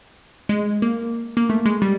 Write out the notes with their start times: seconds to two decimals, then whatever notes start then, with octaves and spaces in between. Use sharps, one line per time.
0.49 G#3
0.82 A#3
1.37 A#3
1.50 A3
1.66 G#3
1.82 G3